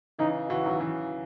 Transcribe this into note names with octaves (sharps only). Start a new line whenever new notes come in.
C#3 E3 D#4
C#3 E3 F#4
D#3 F#3
C#3 E3